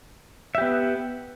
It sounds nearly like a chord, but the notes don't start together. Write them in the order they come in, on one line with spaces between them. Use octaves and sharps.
E5 G4 B3